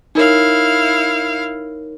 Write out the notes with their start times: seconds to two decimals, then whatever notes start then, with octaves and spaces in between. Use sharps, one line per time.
0.15 D#4 E4 A#4 C#5 F5